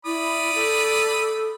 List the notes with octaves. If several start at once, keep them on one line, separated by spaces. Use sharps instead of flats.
E4 D5 B5 D#6
A4